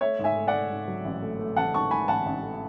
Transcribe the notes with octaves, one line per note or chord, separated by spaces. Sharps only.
A3 C#5 E5
G#2
E5 G#5
A3
D5 F#5
A3
G#2
F#3
A1
A3
A3
A1 F#5 A5
G#2 A5 C#6
G#2 G#5 B5
A1 F#5 A5
A1
A3